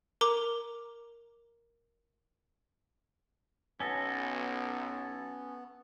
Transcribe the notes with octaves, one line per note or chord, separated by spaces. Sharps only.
A#4 A#5 D6
B1 B3 C#4 A4 G#5 E6 A#6